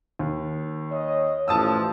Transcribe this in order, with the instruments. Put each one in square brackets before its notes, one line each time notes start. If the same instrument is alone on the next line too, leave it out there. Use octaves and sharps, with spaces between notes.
[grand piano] D#2
[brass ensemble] C#5 D#5
[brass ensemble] A1 F3 [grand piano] A5 D#6 E6